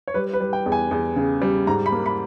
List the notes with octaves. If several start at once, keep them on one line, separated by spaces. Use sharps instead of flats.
C#5
G3 B4
B4
G3
G5
E2
G#5
E2
C#3
G3
G#2 A#5
B5
A#3
B5